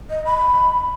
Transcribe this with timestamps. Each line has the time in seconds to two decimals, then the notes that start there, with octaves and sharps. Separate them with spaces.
0.10 D#5
0.25 B5